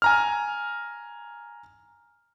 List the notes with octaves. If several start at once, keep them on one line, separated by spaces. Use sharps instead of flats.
G#5 A#5 F6